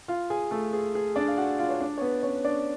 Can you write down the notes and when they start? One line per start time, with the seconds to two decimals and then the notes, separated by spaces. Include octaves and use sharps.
0.08 F4 F5
0.30 G#4 G#5
0.51 A3 A4
0.73 G#4
0.95 G#4
1.16 D4 D5
1.28 F5
1.38 F#4 F#5
1.59 F4 F5
1.69 C#5
1.81 D4 D5
1.98 C#5
2.01 B3 B4
2.23 C#4 C#5
2.44 D4 D5